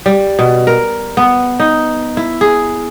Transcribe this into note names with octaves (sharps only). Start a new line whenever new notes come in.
G3
B2
A#4
B3
D#4
E4
G#4